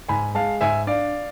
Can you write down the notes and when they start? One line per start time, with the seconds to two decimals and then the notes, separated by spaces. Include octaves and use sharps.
0.08 G#2 G#5 B5
0.35 G#3 F5 A5
0.61 G#2 E5 G#5
0.87 D4 D5 F5